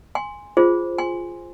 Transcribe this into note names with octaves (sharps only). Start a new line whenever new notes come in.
G#5 C6
F4 G#4 C5
G#5 C6